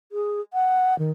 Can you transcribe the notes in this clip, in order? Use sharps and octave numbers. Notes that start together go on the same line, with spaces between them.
G#4
F#5
D#3